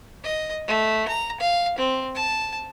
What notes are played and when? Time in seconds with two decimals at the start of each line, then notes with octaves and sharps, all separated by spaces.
0.24 D#5
0.68 A3
1.08 A#5
1.40 F5
1.78 C4
2.15 A5